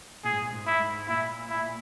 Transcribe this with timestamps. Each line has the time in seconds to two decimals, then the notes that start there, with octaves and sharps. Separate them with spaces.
0.24 A#2 G#4
0.32 G#2
0.42 A#2
0.53 G#2
0.67 E4
0.80 G#2
1.08 A#2 E4
1.50 E4